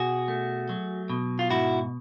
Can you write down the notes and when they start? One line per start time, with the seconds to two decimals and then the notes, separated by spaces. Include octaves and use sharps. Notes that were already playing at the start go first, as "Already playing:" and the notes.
Already playing: B2 F#4 G#4
0.28 A3
0.69 F#3
1.10 B2
1.39 F4
1.50 G#2 E4 F#4